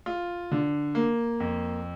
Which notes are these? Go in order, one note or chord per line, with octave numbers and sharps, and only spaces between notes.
F4
D3
A#3
F2